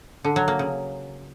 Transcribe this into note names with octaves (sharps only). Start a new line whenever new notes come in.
D3
F#3
A#3
C#3